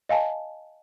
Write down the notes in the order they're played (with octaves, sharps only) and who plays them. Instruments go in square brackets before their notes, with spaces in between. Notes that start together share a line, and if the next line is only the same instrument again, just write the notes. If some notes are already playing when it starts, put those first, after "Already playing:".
[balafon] D#5 F5 G#5 A5